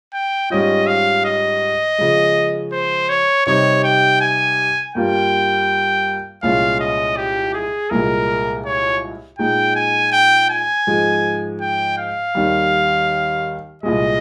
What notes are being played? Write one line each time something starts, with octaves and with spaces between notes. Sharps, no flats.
G5
G#2 G3 C#4 F4 D#5
F5
D#5
C#3 F3 G#3
C5
C#5
C3 G3 C4 D#4 C#5
G5
G#5
G2 G3 A#3 F4 G5
C2 A#2 G#3 C#4 F4 F5
D#5
G4
G#4
C2 A#2 G#3 A#4
C#5
A#2 G#3 D#4 G5
G#5
G5
G#5
G#2 F3 G#3
G5
F5
D#2 D#3 G3
C2 A#2 G#3 D#5